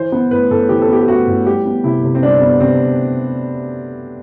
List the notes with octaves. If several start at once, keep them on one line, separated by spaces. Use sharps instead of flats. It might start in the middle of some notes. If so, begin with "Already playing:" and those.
Already playing: E3 C5
B3
A2 B4
A2 A4
E3 G4
A4
B3 G4
G4
A2 F#4
A2
G3 G4
B3
C3 E4
C3
C4
G3 D4
B3
C3 C4